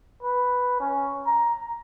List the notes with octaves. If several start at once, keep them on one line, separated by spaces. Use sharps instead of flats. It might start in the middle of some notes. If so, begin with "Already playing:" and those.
B4
C#4
A#5